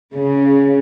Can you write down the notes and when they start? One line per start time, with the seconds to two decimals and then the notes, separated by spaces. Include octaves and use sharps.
0.14 C#3